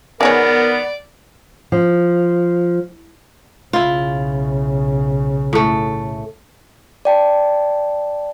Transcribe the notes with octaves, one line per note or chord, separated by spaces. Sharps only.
D#3 G#3 B3 A#4 C#5 D5
F3
B1 C#3 E4 F4
A2 A3
D5 G5 A5